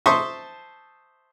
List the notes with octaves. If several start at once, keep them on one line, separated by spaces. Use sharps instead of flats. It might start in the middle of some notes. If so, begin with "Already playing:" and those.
C5 E5 A5 C6 C#6 D#6